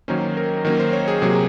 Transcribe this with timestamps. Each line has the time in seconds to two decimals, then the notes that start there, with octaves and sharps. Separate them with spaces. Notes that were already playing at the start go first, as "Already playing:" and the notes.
0.08 D#3 F#3 A#3 C#4 C5
0.37 A#4
0.65 D#3 F#3 A#3 C#4 A#4
0.80 C5
0.93 C#5
1.08 G#4
1.22 C3 F#3 A#3 G#4